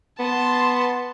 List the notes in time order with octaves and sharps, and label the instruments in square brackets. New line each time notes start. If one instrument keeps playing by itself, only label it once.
[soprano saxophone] B3 [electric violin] A5 C6